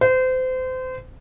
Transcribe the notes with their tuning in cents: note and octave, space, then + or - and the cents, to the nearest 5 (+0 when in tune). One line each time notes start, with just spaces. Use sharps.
C5 -30